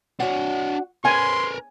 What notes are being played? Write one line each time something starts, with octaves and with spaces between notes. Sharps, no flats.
D4 F#4 C#5 F#5
C#4 A#4 B4 G#5 C6